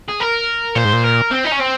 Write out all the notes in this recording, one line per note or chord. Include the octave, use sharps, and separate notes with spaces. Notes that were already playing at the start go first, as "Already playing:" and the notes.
G#4
A#4
A#2 C5
G#2
A#2
A#4
C4
D#4
C#4
C4